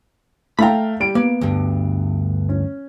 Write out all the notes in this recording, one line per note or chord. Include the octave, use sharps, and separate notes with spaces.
A3 F5 G5 A#5 B5
G3 D7
A#3 B3
D2 G2
C#4